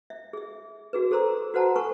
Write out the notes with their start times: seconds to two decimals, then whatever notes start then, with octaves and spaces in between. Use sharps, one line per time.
0.10 E5
0.33 G#4 E5
0.93 F#4 G#4 B4
1.11 G#4 A4 C5 A#5 C6 E6
1.54 F#4 B4 C5 F#5 A5 A#5
1.76 A4 B4 G#5 C#6